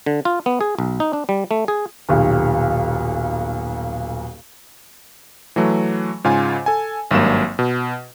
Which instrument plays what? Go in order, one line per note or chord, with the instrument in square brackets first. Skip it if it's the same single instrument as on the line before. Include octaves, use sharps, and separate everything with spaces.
[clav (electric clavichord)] D3
F4
B3
G#4
B1
D#4
D4
G3
A3
G#4
[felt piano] D#1 B1
[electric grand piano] E3 F#3 A3
G#2 C#3 F4 G#5
A4 G#5
G#1 G2 F#3 A#3 E7
B2